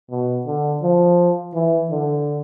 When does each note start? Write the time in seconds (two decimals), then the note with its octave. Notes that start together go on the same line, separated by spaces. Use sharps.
0.11 B2
0.47 D3
0.82 F3
1.54 E3
1.90 D3